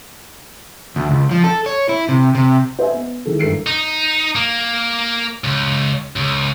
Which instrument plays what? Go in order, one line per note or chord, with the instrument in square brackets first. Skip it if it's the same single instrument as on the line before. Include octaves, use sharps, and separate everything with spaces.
[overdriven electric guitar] D2
C#2
F3
A4
C#5
E4
C3
C3
[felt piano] C5 D#5 E5 G#5
B3
D#3 E3 G#3 A4
G1 A4 A#4 C7 D7
[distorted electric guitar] D#4
A#3
C#2
C#2